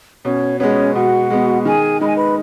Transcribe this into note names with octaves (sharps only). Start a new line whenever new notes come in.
B2 C#4 C#5
G#3 B3 C#4 C#5
B2 F#4 F#5
G#3 B3
D#3 G#4 G#5
G#3 D#4 B5
G#5
B4 B5